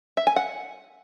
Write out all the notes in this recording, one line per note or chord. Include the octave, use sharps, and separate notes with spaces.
E5
G#5
F#5